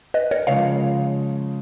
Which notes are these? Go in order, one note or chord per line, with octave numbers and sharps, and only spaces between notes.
B4 D#5
A#4 C#5
C#3 F3 G#3 C#5 F5